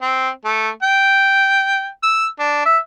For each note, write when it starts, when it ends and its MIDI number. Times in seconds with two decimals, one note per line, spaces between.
0.02 0.29 60
0.45 0.69 57
0.83 1.87 79
2.03 2.26 88
2.39 2.63 62
2.65 2.78 76